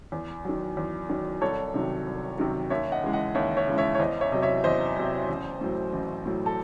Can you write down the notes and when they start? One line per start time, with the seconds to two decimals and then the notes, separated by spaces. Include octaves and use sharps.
0.12 E2
0.45 D#3 F#3
0.77 E2
1.09 D#3 F#3
1.41 C2 A4 C#5
1.74 C3 D#3 F#3
2.06 C2
2.38 C3 D#3 F#3
2.70 D#2 C#5 E5
2.92 D#5 F#5
3.03 C#3 E3 G#3
3.13 D#5 F#5
3.35 D#2 C#5 E5
3.57 C#5 E5
3.67 C#3 E3 G#3
3.78 C#5 E5
3.95 C#5
3.99 E2 C5 D#5
4.21 C#5 E5
4.32 C3 F#3 D#5
4.42 C#5 E5
4.64 E2 C5 D#5
4.96 C3 F#3
5.29 A1
5.61 A2 F#3
5.93 A1
6.25 A2 F#3
6.46 A4